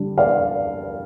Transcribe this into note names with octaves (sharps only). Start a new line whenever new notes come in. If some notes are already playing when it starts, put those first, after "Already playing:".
Already playing: D3 G3 D4
D5 F5